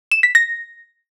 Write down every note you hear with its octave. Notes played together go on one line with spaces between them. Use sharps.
E7
B6
A#6